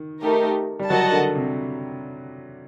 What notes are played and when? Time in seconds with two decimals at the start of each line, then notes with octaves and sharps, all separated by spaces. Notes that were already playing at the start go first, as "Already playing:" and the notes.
Already playing: D#3
0.22 A3 D#4 G4 A#4
0.79 G3
0.90 F#3 F#4 A#4 D#5 F#5 A5
1.12 D3
1.35 C3